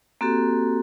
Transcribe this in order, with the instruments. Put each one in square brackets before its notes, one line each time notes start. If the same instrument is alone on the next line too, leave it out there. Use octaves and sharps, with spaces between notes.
[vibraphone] A#3 C4 F#4 G4 A4